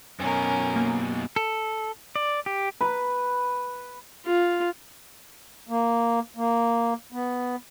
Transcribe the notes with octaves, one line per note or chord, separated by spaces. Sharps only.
F#2 B2 C#4 A#4
A#3
A4
D5
G4
B4
F4
A#3
A#3
B3